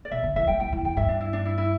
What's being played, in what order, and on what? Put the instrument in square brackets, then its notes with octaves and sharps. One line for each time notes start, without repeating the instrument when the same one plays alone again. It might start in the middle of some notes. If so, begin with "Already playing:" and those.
[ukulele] D5
[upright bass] B2 [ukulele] E5
[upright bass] D3
[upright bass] E3 [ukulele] E5
[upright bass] G3 [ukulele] G5
[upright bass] G3 [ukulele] G5
[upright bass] E3
[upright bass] E2 [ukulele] G5
[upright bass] G2 [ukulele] E5
[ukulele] D4
E4
D4
E4
E4